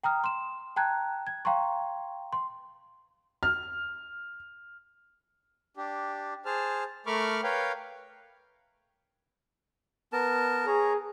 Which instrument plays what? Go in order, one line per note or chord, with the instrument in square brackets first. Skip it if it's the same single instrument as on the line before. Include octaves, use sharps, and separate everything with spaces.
[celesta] G5 A#5 D#6 F6
C6 E7
G5 A5 A#5 F#6 G#6
G#6
F5 G5 A#5 C6 C#6
C6
[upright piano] F6
[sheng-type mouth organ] D4 G4
G#4 C5 A5 F6
A3 A#4 B5 C#6 D6 F6
A#4 B4 C#5 F5 G5
[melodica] B3 A#4 A5
[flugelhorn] G#4 [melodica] C#5 A#5